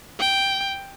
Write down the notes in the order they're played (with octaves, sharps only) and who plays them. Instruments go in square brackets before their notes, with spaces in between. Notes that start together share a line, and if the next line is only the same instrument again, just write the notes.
[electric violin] G5